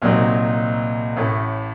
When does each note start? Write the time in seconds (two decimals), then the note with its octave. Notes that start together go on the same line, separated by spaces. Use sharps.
0.02 C2 A#2 F#3 C4 D#4
1.17 A1 A2 A3